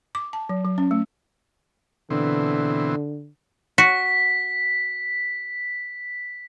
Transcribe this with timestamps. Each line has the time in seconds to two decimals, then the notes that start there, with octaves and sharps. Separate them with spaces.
0.15 D6
0.33 A5
0.49 F#3
0.65 F#3
0.78 C#4
0.91 A3
2.10 B2 D3 E3 C4
3.78 F#4 B6